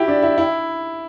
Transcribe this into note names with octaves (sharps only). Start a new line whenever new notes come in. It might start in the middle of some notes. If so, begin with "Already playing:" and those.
Already playing: E4 F#4 G4
D4
E4
E4